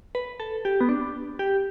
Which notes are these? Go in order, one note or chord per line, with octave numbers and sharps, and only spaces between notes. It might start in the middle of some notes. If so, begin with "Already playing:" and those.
B4
A4
G4
B3
D4
G4